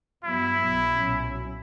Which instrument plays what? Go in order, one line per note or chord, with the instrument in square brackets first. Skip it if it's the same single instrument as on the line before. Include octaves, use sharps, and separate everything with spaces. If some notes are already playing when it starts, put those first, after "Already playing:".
[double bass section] G2 F#3 B3 [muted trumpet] E4
[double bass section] B1 B2 F#3 B3
B1 A#2 F#3 C#4